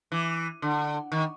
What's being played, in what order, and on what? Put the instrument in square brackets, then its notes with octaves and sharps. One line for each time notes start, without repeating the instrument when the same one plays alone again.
[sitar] E3
D3
D#3